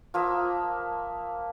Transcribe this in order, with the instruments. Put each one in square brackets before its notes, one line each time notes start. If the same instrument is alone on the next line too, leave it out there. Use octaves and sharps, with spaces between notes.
[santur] F3 A#3 E5 D#6